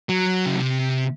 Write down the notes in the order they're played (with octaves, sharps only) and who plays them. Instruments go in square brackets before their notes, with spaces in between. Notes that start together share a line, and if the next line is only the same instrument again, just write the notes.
[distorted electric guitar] F#3
C#3
C3